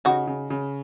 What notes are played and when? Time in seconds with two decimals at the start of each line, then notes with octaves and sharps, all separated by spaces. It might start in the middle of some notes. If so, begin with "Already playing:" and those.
0.05 C#3 D#4 F#4
0.27 C#3
0.50 C#3